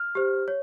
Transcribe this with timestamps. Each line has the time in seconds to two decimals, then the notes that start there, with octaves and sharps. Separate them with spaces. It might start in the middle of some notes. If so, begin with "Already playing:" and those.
Already playing: F6
0.15 G4 C5
0.48 C#5